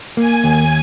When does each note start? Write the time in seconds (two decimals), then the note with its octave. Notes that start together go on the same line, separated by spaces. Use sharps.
0.17 A#3 G#5
0.44 D#2